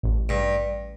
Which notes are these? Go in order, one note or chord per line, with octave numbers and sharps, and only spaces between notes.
A1
G2